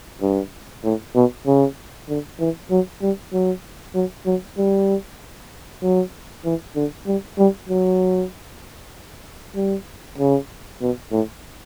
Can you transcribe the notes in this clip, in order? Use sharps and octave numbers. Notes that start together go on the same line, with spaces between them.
G2
A2
B2
C#3
D3
E3
F#3
G3
F#3
F#3
F#3
G3
F#3
E3
D3
G3
G3
F#3
G3
C#3
B2
A2